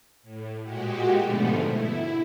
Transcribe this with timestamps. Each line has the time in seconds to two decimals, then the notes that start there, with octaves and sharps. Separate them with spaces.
0.23 A2
0.62 A#2 G#3 F#4 G4
1.16 G#2 B2 D3 F3 A3 B3
1.62 E4